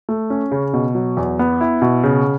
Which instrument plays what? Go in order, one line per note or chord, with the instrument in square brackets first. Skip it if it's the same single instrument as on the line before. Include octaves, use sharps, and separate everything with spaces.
[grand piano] A3
C#4
C#3
B2
F#3
E2
B3
E4
B2
C#3